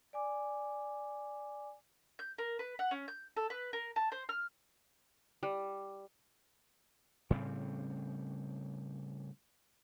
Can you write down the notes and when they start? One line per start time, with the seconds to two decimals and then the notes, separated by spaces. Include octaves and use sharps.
0.13 D5 G#5 D6
2.19 G6
2.38 A#4
2.59 B4
2.79 F#5
2.91 C#4
3.08 G6
3.37 A4
3.50 B4
3.73 A#4
3.96 A5
4.12 C5
4.29 F6
5.43 G3
7.30 A2 C#3 G3 C4